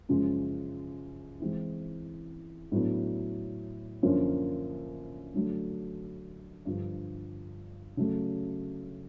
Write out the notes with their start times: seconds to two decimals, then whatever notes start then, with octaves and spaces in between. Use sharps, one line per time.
0.09 F#2 C#3 F3 G#3
1.40 E3 G#3 C4 E4
2.72 A2 F#3 B3 D4
4.03 F#2 D3 F3 A#3 C#4
5.35 D3 F#3 A3 D4
6.65 G2 D3 F3
7.97 C#3 F#3 A3